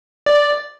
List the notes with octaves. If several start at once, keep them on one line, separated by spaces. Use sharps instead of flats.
D5